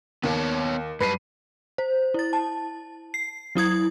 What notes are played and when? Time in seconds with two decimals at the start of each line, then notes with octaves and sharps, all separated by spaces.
0.23 D#2 B3 C#5 A5
1.00 F#2 G3 B4 A5 C7 D#7
1.78 C5
2.14 E4 A6
2.33 A5
3.14 C7
3.55 F#3 E4 D#6 G#6